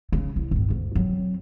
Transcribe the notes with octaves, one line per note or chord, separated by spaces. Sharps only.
C#3
C2
G1 A2
D2
F#3 C4